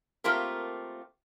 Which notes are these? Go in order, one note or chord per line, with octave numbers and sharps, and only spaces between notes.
A3 A#3 C4 F4 G4 A#4